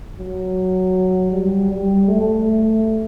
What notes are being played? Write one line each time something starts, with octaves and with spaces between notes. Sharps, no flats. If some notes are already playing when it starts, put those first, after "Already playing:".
F#3
G3
G3
A3